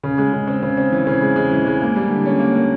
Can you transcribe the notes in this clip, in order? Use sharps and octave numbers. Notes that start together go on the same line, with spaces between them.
C#3
G#3
C#3
C4
C#3
C4
E3
C#3
G#3
G#3
E3
G#3
A#3
G3
D3
C#4
A#3
A#3